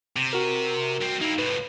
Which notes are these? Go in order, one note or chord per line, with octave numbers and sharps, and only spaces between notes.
C3
F#4 A#4
G2 C4
A#3 D#4 E4
C#2 A2 B4